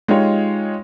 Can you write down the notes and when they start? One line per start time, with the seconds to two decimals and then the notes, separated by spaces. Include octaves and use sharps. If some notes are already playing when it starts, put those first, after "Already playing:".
0.08 G#3 D#4 F4 G4 C#5